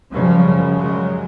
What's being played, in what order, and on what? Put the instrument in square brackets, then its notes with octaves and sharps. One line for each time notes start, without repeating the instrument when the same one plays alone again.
[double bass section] F#2 C#3 F3 G3
F#3 G#3